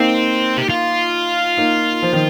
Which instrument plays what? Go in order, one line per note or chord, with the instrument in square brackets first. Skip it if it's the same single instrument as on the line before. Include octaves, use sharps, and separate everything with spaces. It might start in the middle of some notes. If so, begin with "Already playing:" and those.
Already playing: [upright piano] A#3 D#4 [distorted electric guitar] C4
[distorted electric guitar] G4
F4
[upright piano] A#3 D#4
F3
D#3